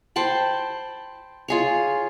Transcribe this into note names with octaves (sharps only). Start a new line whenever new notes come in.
C5 G5 A5 B5
F4 G#4 C#5